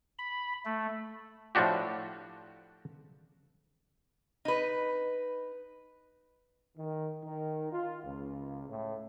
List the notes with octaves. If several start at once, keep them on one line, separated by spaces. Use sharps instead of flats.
B5
A3
A2 F3 A3 D4 F#4 G4
D#4 B4
D#3
D#3
F4
C#2
A2